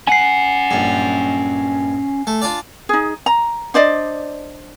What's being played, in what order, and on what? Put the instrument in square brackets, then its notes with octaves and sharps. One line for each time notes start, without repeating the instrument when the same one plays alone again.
[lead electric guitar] C#4 F#5 [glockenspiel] G#5 C7
[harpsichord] A#1 G2
A3
D4 F4 D5
[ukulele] D#4 G#4
A#5
D4 C5 D5 D#5